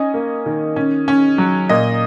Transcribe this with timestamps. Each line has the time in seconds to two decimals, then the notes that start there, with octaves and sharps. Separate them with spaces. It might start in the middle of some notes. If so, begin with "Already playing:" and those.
Already playing: C#4 D#4 D#5 G#5
0.14 A#3
0.46 D#3
0.76 C#4
1.08 C#4
1.38 F#3
1.69 A#2 D#5